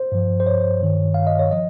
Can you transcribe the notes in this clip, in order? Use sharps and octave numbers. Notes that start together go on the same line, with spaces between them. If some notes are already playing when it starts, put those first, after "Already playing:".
Already playing: C5
G2 F3
C5
C#5
G2 D#3
F5
D#5
C#5
F3 D#5